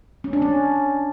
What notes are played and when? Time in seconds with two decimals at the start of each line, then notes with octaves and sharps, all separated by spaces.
0.24 C#4
0.33 D4
0.42 C#4